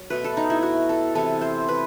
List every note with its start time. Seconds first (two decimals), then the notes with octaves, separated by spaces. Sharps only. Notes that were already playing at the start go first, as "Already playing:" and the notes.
Already playing: F#3
0.10 B2 A3 B4
0.24 A4
0.37 D#4
0.50 E4
0.63 F#4
0.89 A4
1.15 C3 E3 B3 A4
1.41 C5
1.69 B4